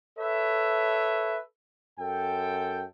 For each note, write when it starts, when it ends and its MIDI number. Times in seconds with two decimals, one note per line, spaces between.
0.18 1.39 69
0.18 1.39 71
0.18 1.39 73
0.18 1.39 76
1.99 2.85 42
1.99 2.85 69
1.99 2.85 79